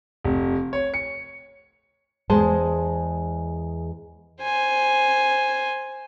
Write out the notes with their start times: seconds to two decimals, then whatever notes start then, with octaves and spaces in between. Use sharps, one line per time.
0.25 F1
0.73 C#5
0.94 C#7
2.30 E2 G#3 G#4 C5 A5
4.41 C5 G#5